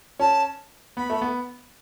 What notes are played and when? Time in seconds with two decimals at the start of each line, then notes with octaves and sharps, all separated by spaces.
0.19 C#4 A5
0.97 B3 B5
1.10 A3
1.21 B3